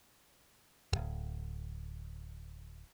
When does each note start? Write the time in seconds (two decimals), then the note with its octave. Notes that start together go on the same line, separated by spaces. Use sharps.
0.92 D1 G#1